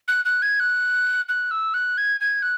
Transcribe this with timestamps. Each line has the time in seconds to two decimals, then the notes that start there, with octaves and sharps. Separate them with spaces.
0.08 F#6
0.25 F#6
0.42 G#6
0.60 F#6
1.29 F#6
1.51 E6
1.74 F#6
1.98 G#6
2.20 G#6
2.42 F#6